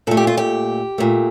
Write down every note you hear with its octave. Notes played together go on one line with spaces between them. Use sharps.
A#2 A3 A4
G4
F4
G4
A#2 A3